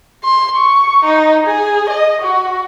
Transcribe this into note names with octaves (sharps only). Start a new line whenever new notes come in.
C6
C#6
D#4
G#4
D#5
F#4